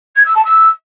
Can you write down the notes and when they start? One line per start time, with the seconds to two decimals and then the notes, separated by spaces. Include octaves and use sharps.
0.16 G#6
0.25 E6
0.35 A5
0.45 E6